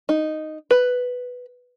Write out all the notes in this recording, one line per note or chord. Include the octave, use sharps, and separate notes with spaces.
D#4
B4